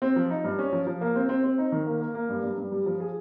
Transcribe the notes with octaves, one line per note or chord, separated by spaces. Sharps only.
C4
F3
D#4
G2
C#4
F3
F3
A#3
C4
C4
C4
D#4
D#3
A#3
A#3
A#3
G2
G2
G2
G3
F3
G#4